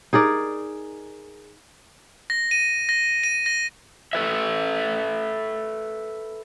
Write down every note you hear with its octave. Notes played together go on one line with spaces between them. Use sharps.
D#4 G#4 A#4 D5
A#6
D#7
A#6
D#7
A#6
A4 B4 E5